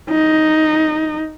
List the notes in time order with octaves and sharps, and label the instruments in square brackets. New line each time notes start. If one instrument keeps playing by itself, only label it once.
[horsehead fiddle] D#4